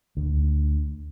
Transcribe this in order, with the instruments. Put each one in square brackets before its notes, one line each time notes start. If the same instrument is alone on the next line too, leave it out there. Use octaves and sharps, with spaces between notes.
[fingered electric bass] D2